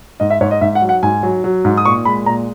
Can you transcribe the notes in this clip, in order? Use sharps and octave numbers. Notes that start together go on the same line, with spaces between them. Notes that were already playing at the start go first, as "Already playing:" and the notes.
G#2 D#5
E5
G#2 C#5
D#5
G#2 E5
F#5
F#3
F#5
G#2 G#5
F#3
F#3
G#2
D#6
A#2 C#6
G#3 B5
A#2 A#5